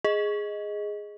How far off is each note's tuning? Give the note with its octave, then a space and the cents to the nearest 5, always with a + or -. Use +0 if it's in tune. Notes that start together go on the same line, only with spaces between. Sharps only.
G#4 +0 D#5 +5